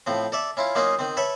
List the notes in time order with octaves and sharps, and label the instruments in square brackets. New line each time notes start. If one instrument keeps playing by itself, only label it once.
[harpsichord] A2 F3 C4
A4 D5 E5
C#4 E4 F4
F#3 A#3 C#4 D#4 F4 G#4
D#3 C4
A4 B4 C#5 E5